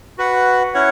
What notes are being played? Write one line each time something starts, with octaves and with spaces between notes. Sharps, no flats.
F#4 B4 F#5
C#4 E4 C#5 F#5